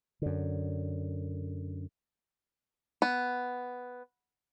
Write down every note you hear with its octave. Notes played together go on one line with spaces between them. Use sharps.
F#2 D3
B3